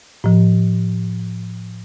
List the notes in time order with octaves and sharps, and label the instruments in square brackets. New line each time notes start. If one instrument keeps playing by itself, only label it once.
[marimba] A2 F3